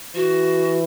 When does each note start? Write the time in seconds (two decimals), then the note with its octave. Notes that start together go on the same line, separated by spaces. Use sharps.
0.15 E3 F#4